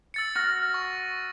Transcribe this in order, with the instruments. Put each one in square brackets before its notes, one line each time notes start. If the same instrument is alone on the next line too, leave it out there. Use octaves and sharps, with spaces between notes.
[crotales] E6 A6 C#7
[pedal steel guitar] F#4 F6 F#6 [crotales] A#6
[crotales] C#6